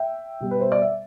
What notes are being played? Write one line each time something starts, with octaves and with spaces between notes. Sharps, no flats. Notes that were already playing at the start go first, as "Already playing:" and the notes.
Already playing: E5 G5
B2 G3
B4
C5
D5
E5